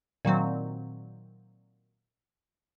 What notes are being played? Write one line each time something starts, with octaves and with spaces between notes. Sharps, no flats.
A#2 D#3 F#3 C4